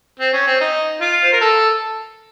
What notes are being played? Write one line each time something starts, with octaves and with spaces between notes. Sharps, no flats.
C4
C#4
C4
D#4
F4
C5
A#4
A4